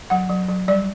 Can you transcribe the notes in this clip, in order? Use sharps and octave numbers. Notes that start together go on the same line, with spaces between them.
F#3 F#5
F#3
F#3
G3 D5